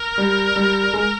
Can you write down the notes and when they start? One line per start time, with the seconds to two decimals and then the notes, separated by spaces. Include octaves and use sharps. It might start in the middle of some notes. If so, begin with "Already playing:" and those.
Already playing: A#4
0.18 G3
0.56 G3
0.94 G#3